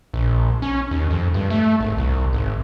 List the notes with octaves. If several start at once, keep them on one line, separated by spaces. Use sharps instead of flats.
A#1
C#4
D#2
F2
G2
A3
G#1
C2
G#1